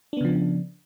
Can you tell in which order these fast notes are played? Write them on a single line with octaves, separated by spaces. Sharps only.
D4 B3 C#3 F3